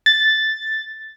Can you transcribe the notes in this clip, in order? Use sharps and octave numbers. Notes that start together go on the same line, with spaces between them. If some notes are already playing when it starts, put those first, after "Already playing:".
A6